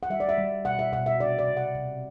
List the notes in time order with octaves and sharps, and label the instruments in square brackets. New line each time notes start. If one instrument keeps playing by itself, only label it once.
[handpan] F#5
G3 E5
D5
E5
G3
B2 F#5
E5
B2 F#5
E5
C3 D5
D5
C3
F#5
C3